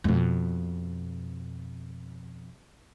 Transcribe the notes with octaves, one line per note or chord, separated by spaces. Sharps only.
F2 B2